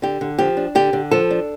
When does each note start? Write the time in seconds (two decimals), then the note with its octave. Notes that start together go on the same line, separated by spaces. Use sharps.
0.02 D3 G4
0.21 D3
0.38 F3 G4
0.57 D4
0.75 D3 G4
0.93 D3
1.11 F3 A4
1.30 D4